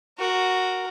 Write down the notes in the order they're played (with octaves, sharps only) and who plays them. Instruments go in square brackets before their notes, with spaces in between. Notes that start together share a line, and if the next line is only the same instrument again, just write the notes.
[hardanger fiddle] F#4 A#4